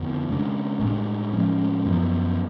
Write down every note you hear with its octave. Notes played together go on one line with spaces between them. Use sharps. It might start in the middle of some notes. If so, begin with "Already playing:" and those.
Already playing: F2 D3 F3 B3
C#3 G#3 D4
A2 G#3 B3 D4
A2 F3 G#3 C#4
F#2 F3 B3